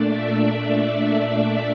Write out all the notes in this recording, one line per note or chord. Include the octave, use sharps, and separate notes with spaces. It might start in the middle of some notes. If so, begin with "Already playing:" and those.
Already playing: A#2 A3 D4 D5
E5